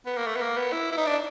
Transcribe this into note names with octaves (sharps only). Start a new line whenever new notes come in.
B3
A#3
A3
B3
A#3
B3
E4
E4
D#4
D4